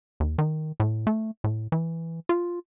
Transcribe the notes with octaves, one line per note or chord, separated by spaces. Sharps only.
D#2
D#3
A2
A3
A2
E3
F4